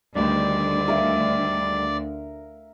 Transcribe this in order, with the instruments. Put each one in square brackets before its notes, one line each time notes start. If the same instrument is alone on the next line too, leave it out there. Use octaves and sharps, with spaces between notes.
[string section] D2 D3 [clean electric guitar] G2 D#3 G3 [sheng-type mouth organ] D5
[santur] A#4 E5 F5